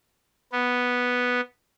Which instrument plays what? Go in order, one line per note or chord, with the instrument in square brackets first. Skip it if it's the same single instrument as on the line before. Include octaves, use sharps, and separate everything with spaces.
[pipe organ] B3